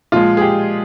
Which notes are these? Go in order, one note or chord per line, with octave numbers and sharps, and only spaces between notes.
A#2 F3 G#3 F4
G#4
G4